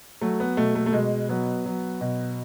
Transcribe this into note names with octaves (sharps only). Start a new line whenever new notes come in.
F#3 A3
B3
B2 A3
A3
A3
B2 G#3
F#3 B3
F#3
B2